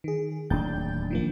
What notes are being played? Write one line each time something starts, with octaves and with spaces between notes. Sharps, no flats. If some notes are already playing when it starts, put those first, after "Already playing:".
D#3 G#4
D1 D#2 D4 G5 G6 A6
D#3 F3 A#3